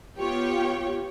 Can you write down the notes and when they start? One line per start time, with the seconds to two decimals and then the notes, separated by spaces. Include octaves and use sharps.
0.18 B3 F4 G4 C#5 G5